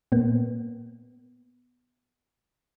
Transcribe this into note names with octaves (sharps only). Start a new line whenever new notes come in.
A#2 A#3 B3